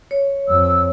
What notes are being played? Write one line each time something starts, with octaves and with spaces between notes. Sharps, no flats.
C#5
F2 E6